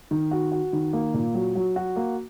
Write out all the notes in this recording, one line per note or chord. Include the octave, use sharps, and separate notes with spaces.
D#3
F#4
F#4
D#3
A#3
A#2
F#3
F#3
F#4
A#3